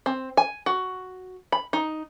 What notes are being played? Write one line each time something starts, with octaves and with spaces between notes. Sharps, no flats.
C4
G#5
F#4
B5
D#4